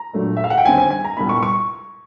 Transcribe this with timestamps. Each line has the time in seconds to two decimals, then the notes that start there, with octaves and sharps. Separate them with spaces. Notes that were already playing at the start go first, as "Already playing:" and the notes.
Already playing: A#5
0.13 A#2 F#3 A3 D4
0.37 E5
0.44 F5
0.50 F#5
0.58 G5
0.65 D#2 D3 G3 C4 G#5
0.78 G#5
0.90 G#5
1.04 A#5
1.17 C2 A#2 G3 B3 B5
1.29 C#6
1.43 C#6